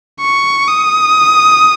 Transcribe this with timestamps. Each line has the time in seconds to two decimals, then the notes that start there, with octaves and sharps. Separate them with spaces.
0.21 C#6
0.68 D#6